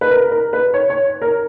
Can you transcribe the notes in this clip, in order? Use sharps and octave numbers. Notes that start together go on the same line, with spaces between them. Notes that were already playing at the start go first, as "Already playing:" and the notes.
B4
A#4
A#4
B4
C#5
C#5
A#4